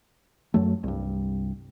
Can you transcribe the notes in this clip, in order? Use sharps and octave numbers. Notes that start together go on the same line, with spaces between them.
F#2 F#3 A3
C2 G2